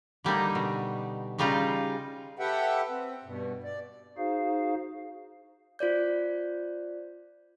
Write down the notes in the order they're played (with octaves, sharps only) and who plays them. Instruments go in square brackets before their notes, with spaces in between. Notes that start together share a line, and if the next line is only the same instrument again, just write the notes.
[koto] D3 G3 A#3 D#4
B2
C#3 G3 D#4 F4 F5 A#5
[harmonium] G4 A4 B4 E5 F#5 G5
C4
G2 B2
D5
[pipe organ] D#4 F#4 G#4 C5 F5
[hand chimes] F4 C5 D5 G6